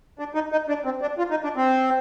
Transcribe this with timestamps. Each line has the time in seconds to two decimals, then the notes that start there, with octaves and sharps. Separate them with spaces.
0.19 D4
0.35 D#4
0.52 D#4
0.69 D4
0.85 C4
1.02 D4
1.18 F4
1.31 D#4
1.44 D4
1.56 C4